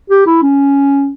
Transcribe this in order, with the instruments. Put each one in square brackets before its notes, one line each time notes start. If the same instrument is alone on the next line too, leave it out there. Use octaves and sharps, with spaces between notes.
[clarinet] G4
E4
C#4